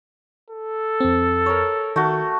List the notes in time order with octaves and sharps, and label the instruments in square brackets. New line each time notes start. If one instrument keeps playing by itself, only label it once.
[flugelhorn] A4
[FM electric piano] F2 C4
[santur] A#4 C#5
[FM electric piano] D#3 [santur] A3 F#4